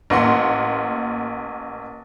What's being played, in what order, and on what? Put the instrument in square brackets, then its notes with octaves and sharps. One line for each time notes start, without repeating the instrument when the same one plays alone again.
[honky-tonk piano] A1 A#3 F#5 C6